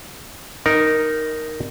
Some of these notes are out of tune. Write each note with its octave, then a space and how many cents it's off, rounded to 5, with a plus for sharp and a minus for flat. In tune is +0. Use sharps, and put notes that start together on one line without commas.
D#4 +0 A#4 +0